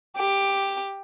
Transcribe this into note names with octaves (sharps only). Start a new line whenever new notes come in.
G4